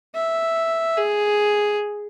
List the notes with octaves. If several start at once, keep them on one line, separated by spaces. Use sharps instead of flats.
E5
G#4